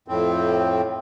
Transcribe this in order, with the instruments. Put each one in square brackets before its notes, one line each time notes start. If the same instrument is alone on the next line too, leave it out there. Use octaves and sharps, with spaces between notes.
[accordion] F2 A2 C4